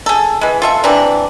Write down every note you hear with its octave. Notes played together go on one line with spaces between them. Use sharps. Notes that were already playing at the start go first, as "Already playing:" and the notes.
G#4 A4
E3 G#3
F4 A4 E5
C3 E3 A#3 D4